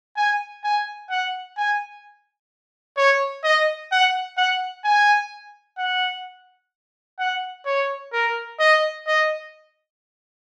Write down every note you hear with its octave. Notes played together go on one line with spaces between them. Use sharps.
G#5
G#5
F#5
G#5
C#5
D#5
F#5
F#5
G#5
F#5
F#5
C#5
A#4
D#5
D#5